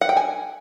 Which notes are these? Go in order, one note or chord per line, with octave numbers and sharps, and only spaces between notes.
F#5
G5
G#5